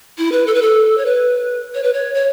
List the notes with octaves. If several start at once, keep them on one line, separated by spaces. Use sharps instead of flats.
E4
B4
A4
B4
A4
C#5
B4
C#5
B4
C#5
C#5